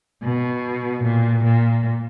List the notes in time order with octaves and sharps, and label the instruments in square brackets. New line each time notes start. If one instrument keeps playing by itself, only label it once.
[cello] B2
A#2
A#2